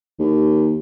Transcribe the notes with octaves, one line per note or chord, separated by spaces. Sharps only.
D#2